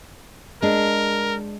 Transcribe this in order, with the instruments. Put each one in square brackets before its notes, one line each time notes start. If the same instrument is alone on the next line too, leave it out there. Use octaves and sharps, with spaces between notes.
[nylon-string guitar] G#3 D4 [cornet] A#4